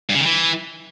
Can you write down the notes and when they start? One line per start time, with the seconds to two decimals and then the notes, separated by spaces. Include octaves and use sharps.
0.10 G2
0.15 C#3
0.20 D#3
0.26 E3